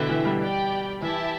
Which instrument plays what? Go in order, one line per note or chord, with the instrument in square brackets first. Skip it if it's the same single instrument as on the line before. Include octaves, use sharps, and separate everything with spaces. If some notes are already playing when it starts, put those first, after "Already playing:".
Already playing: [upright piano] B2 D3 [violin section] E4 B4 E5 G5
[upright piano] E3
G3
[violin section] G4 D5 G5
[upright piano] E3 [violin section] E4 G4 E5 A5